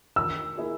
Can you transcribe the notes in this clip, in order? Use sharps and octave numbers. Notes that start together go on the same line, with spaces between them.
D#3 E6
A#3 E4 G#4